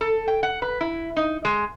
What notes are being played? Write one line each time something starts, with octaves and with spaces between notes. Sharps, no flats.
A4
G5
F#5
B4
E4
D#4
G#3